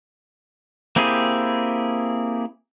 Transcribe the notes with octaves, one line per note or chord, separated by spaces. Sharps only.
A#3 C4 E4 G4 G#4